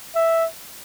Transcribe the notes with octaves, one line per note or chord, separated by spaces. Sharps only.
E5